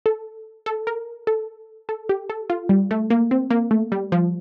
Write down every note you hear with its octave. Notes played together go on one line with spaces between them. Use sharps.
A4
A4
A#4
A4
A4
G4
A4
F4
G3
A3
A#3
C4
A#3
A3
G3
F3